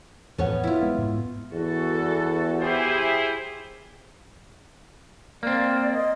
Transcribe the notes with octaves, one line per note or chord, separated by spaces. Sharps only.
E2 A2 F3 B3 C#4 A4 C#5 F#5
E4 F4
G#3 B3
G#2
E2 F#4 A4
E4 G4 G#4 C5
A#3 C4 D5
D#5